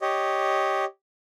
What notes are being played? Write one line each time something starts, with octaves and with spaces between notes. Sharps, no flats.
G4 C#5 D#5